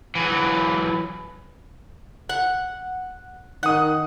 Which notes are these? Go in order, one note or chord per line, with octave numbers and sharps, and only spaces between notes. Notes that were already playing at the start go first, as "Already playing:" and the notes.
E3 F#3
F#5
D#3 F#5 D#6 F#6